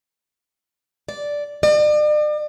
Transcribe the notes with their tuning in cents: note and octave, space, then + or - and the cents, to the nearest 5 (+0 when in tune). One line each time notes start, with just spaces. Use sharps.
D5 -5
D5 +40